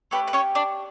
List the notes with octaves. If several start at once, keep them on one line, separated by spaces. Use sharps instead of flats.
A3 C#4 G4 B4
B4
C#4 C#5
D4 D5